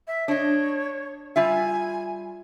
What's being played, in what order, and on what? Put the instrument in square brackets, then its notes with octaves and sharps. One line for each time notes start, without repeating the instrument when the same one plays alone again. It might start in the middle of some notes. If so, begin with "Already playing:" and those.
[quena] E5
[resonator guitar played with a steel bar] D4 D#5 [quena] C#5
[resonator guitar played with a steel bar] G3 F4 E5 [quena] G#5